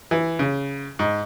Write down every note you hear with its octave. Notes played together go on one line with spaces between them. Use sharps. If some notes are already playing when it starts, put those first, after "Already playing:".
E3
C#3
G#2